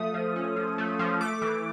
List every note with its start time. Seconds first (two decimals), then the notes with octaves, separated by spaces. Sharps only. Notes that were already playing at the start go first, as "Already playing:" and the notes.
Already playing: F3 A3 D#6
0.14 F3
0.36 C#4
0.56 F3
0.78 A3
0.99 F3
1.21 A3 D6
1.42 E3